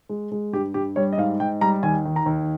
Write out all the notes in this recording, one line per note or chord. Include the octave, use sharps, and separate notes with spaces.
G#3
G#3
G2 G4
G2 G4
G3 C#5
D#5
G#2 F5
G#2 G5
G3 A#5
D#2 G#5
D#3
A#5
D#2